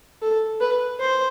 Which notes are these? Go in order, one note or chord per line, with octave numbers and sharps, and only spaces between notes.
A4
B4
C5